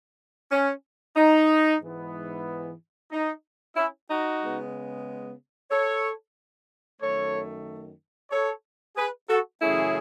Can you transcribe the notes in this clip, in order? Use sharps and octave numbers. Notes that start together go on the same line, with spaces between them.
C#4
D#4
G#2 E3 B3
D#4
C#4 E4
D#4 F#4
C#3 G#3 B3
A4 C#5
F#2 D#3 A3 A4 C#5
A4 C#5
G#4 B4
F#4 A4
F#2 C#3 E3 A3 C#4 E4 G#4